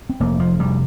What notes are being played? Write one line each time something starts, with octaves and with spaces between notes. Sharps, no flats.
C4
F1 A#3
F3
C3 G3